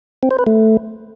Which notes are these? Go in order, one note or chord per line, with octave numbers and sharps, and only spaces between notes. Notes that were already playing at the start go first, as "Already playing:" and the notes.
C4
C5
B4
A3